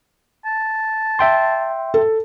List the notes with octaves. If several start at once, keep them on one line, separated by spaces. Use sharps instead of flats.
A5
E5 G5 C6
A4